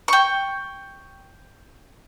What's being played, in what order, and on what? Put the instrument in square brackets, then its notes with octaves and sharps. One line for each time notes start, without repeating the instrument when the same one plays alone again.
[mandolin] G5 C#6